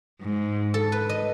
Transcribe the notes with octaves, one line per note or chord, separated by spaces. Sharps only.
G#2
A4
B4
D#5